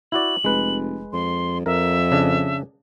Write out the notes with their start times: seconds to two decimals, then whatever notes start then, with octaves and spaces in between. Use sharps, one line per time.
0.12 E4 F#4 D5 F#7
0.44 F1 G#3 B4
1.13 F2 C6
1.66 F2 A#4 E5
2.12 C#3 D4 D#5